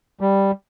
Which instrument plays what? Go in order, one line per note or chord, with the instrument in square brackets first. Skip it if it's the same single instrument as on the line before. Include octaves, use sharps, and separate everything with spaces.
[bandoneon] G3